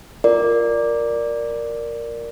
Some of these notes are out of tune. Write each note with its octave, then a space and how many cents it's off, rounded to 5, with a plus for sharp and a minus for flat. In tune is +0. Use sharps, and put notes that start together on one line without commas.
F4 +0 A#4 +0 D5 +0